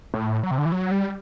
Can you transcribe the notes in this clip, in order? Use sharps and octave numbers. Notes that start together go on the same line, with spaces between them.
A2
F#3
C3
D3
E3
F#3
G3